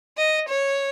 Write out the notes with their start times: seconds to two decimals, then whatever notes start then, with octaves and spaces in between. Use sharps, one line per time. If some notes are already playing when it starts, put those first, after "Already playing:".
0.18 D#5
0.48 C#5